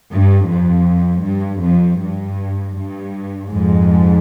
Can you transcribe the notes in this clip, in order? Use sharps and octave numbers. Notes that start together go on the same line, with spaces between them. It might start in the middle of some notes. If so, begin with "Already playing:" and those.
G2
F2
G2
F2
G2
G2
F2 G#2